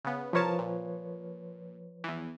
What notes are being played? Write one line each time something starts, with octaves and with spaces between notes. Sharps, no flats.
C#3 B3
C2 F3 A#4 B4 C#5 A5
A#2
E2 E3